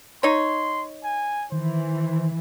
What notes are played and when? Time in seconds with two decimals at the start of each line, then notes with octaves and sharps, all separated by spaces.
0.23 D#4 C#5 C6
1.04 G#5
1.52 D#3 E3 C5